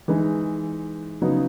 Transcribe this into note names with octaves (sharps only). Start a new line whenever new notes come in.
E3 G#3 D#4
C#3 F#3 B3 D#4